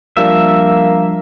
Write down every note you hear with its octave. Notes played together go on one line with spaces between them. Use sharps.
F3 G3 A#3 D4 E5